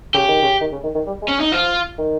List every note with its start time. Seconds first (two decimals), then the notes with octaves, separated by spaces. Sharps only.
0.14 C#3 G4
0.28 D#3
0.42 C#3
0.61 D#3
0.72 C#3
0.83 D#3
0.95 D#3
1.06 G3
1.22 G#3
1.28 C#4
1.40 D#4
1.52 F3 F4
1.98 D#3